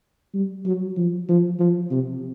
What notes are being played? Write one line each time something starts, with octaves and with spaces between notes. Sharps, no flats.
G3
F#3
F3
F3
F3
C3